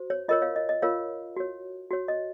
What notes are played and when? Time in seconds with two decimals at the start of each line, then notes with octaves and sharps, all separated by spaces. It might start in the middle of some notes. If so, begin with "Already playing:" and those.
Already playing: F#4 C5
0.10 C#5
0.28 F4 A#4 C#5 D#5
0.42 C#5 F5
0.56 D#5
0.69 D#5
0.82 F4 A#4 C#5 F5
1.37 F#4 C#5
1.91 F#4 C#5
2.08 D#5